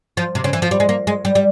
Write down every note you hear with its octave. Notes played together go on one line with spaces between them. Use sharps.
F3
C3
C#3
E3
F3
G3
G#3
A#3
G#3
G3
G3